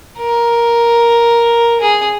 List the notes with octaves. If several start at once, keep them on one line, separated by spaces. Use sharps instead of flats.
A#4
G#4